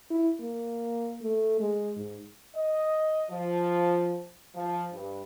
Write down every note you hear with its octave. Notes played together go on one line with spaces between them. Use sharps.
E4
A#3
A3
G#3
G#2
D#5
F3
F3
G2